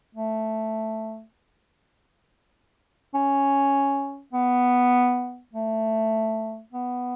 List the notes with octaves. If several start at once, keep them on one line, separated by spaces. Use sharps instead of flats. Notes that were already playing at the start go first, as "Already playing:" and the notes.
A3
C#4
B3
A3
B3